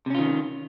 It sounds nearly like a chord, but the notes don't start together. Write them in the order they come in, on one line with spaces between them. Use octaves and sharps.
C3 C#4 F4 D#3